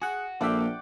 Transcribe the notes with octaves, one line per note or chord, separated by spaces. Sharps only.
F#4 G#4 F#5
A#1 A#3 A4 D5 E5 F#5 G5